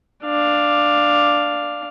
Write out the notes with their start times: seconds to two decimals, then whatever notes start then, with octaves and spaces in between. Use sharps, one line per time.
0.24 D4 F5